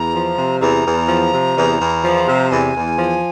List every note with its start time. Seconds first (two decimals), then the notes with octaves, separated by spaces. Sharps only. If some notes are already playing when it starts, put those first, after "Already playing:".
Already playing: E2 A#5
0.14 F3
0.37 C3
0.61 E2 A#5
0.85 E2
1.09 F3
1.32 C3
1.56 E2
1.80 E2
2.04 F3
2.27 C3
2.51 E2 G#5
2.75 E2
2.99 F3